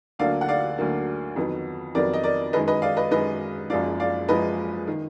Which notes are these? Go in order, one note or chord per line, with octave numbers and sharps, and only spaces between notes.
D2 D3 F#3 A#3 D5 F5
F#5
D5 F5
D2 D3 F#3 A#3
F2 D#3 F#3 B3
F2 D#3 F#3 B3 A#4 D5
D#5
A#4 D5
F#2 D#3 G#3 B4 D#5
B4 D#5
D5 F5
B4 D#5
F#2 D#3 G#3 B4 D#5
F#1 F#2 F3 G#3 D5 F5
D5 F5
F#1 F#2 F3 G#3 B4 D#5
D#3